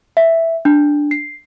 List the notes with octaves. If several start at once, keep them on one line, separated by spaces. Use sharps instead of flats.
E5
D4
C7